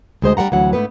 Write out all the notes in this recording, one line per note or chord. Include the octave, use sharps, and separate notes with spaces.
D2 G#3 C5 D#5
G3 C5 F#5 A#5
D2 E3 F#3 F#5
G#2 A3 B3 B4